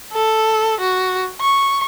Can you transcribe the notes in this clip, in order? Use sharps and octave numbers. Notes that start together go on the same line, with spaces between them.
A4
F#4
C#6